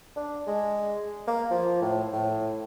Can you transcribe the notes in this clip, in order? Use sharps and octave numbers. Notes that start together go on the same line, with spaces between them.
D4
G#3
A#3
F3
A2
A2